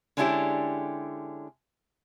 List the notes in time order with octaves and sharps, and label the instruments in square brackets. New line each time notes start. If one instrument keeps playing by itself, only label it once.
[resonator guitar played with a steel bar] D3 G#3 C#4 D4 E4 G4